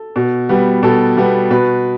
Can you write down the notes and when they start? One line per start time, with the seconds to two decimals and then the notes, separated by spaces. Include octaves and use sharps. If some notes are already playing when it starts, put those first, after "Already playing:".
Already playing: A4
0.16 B2
0.49 G3 B3
0.83 B2 A4
1.17 G3 B3
1.50 B2 B4